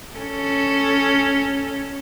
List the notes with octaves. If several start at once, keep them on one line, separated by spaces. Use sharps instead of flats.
C#4 A4